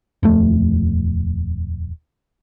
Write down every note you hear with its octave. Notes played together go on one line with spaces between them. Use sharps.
D#1 F2 A3